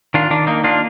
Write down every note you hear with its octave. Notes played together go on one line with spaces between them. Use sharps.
D#3 D4 F4
D#3 D4
A#3 D#4
A#3 D4 F4